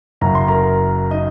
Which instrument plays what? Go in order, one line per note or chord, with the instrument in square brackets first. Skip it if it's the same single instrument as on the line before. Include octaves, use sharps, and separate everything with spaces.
[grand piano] F#1 F#2 F#3 A#5
C6
A#4 A#5
D#4 D#5